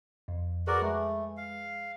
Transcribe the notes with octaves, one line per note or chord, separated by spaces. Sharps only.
F2
F#4 G#4 A#4 B4 D5
G#3 A3
F5